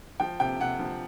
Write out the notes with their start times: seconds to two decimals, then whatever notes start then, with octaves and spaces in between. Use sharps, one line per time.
0.20 F3 G5
0.40 C3 G5
0.60 C3 F#5
0.79 F3